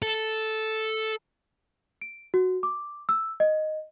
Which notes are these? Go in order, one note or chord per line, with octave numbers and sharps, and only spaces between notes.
A4
D7
F#4
D6
E6
D#5